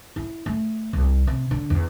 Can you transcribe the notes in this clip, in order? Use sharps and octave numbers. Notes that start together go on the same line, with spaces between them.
E4
A3
C2
C3
D3
E2